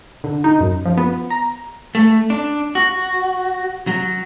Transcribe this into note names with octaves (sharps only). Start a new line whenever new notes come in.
D3
D#4
F#2
F3
B3
A#5
A3
D4
F#4
F#3